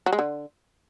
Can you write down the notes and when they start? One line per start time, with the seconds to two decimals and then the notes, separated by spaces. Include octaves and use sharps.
0.06 F#3
0.13 G#3
0.19 D3